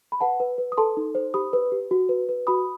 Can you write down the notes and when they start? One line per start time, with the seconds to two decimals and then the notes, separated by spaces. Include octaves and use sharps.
0.12 B5
0.21 B4 F#5 A5
0.40 B4
0.58 B4
0.72 D#6
0.77 A4 A5 C6
0.97 D#4
1.15 C5
1.34 G4 B5 D#6
1.53 B4
1.72 G4
1.91 F#4
2.09 B4
2.29 B4
2.47 F#4 B5 D#6